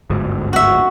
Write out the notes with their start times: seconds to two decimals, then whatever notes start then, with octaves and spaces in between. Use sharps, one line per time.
0.10 G1 D2 G#2
0.53 F#4 E5